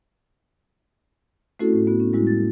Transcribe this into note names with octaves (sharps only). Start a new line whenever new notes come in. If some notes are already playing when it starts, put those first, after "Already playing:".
A3 C4 C#4 E4 F#4 A4
A2
B3 F#4
C#4
A2 G3 G#3 E4 F#4
A6